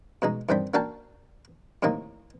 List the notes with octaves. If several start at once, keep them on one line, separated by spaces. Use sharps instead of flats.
B2 G#3 D#4
G2 D#3 C4 D4 G5 B5
A#3 D4 F#4 F5 G5 A5
A2 C3 D#3 A#3 D#4